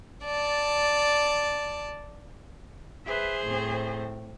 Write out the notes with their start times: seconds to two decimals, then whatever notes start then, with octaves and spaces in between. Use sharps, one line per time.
0.25 D5 A5
3.06 G#4 B4 C5 E5
3.44 A2 C4